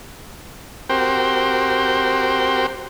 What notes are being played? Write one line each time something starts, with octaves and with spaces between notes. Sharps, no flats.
C4 F#4 G4 A#4 C5 G5